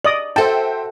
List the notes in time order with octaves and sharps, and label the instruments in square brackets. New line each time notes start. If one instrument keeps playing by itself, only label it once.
[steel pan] D5 D#5 D#6 [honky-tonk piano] F#7
[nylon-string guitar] F#4 A4 [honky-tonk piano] C5 E5 G5 [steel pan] A5